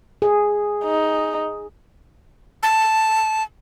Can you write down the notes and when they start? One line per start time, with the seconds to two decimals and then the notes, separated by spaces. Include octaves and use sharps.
0.22 G#4
0.84 D#4
2.63 A5